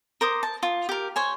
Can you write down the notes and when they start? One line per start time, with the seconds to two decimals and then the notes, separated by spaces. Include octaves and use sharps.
0.21 A#4 C5 D6 D#6
0.43 A5
0.63 F4
0.89 G4 A#4
1.16 C5 C#5 G#5